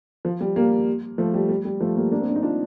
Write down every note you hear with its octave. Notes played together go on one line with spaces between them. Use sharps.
F3
G3
G3 A#3
F3 A3
G3
G3
G3
F3 A3
G3 A#3
A#3 D4
C4
D4
D#4
D4 F4